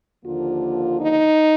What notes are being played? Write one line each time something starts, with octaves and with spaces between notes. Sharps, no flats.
D#2 D3 F3 A#3 F4
D#4